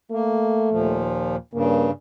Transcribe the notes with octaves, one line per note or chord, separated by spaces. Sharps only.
A3 A#3
D#2 A#2 F3
G2 C#3 A#3